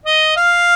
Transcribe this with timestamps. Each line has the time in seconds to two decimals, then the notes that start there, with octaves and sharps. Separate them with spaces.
0.06 D#5
0.36 F5